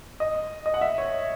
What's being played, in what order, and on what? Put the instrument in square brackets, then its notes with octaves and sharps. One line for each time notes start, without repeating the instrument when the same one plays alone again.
[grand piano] D#5
D#5
F#5
E5
C#5